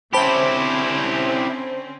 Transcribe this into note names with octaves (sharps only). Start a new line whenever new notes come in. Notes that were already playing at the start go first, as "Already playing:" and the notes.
D3 C4 C#4 E4 G4 C5 A5 B5